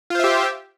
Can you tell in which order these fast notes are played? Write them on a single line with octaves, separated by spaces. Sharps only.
F4 C5 E5 G4